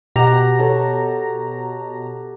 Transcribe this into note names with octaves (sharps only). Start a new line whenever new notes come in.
B2 G4 F#5 A#5 A#6
A4 C#5